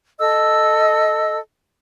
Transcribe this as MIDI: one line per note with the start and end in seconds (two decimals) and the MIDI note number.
0.19 1.38 69
0.19 1.38 75
0.19 1.38 88